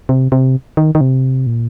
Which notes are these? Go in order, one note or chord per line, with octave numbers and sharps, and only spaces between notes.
C3
C3
D#3
D#3
C3
A#2